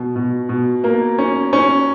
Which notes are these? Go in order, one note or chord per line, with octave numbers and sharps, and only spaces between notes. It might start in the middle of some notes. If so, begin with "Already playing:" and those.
Already playing: B2
B2
B2
A#3
C#4
C#4